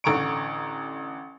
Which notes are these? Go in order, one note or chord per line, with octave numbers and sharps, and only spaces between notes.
A1 D3 A#5 C#6 D7